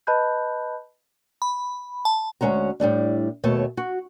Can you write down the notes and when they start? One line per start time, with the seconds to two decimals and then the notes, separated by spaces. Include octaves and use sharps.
0.07 B4 D#5 A5 B5 F#6 G6
1.42 B5
2.05 A5
2.41 D2 G#3 C#4 F#4 A#5
2.80 A2 G3 A3 D4
3.44 D#2 B2 A3 C#5 A5
3.77 F#4